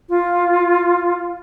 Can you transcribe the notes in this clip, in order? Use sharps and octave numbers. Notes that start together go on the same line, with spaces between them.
F4